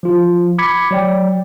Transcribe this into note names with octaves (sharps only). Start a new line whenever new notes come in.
F3 F4
B5 D6 G#6 B6 C#7
F#3 D5 G5